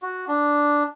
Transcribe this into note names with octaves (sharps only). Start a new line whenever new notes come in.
F#4
D4